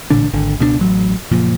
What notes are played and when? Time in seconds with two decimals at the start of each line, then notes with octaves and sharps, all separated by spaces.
0.10 A1 A#2 D3 D4
0.33 G#1 D3
0.59 C#2 B2 G3 D4
0.79 A1 F#3
1.31 F#1 A#2 F3